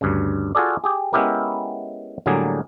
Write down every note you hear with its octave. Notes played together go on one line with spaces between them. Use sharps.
D2 G2 C#3
F4 F#4 G#4 A4 D5
G4 G#4
G#3 B3 C#4 E4 G4 A#4
A2 D3 F#3 G3 A#3 G#4